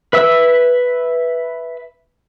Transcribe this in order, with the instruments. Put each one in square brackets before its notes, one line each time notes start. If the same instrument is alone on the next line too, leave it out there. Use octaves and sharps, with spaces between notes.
[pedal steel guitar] B4 E5 E6